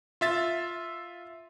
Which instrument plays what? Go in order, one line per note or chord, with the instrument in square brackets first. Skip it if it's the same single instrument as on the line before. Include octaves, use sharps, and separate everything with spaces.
[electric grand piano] F4 E5 A6